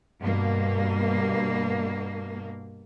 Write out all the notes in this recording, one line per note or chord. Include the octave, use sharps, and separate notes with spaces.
G2 B2 A#3